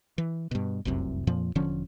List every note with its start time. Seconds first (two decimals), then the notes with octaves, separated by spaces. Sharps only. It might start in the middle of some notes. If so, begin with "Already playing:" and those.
0.18 E3
0.51 G2 B2
0.85 F1 C2 F#2 C3
1.27 F2 A#2 F3
1.55 E1 D3 F3 C#4